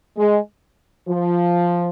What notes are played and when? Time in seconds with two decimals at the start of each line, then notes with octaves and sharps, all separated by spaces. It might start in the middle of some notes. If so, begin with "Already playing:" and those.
0.17 G#3
1.08 F3